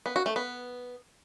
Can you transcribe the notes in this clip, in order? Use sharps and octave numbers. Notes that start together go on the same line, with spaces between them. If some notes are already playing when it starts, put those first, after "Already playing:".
B3
F#4
A3
B3